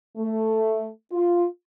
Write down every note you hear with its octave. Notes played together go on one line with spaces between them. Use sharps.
A3
F4